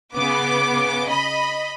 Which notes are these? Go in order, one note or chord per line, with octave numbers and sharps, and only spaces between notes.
C#3 B3 D6
D#5 B5